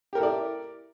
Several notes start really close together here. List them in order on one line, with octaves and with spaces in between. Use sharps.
G4 A#4 A4 E4 D5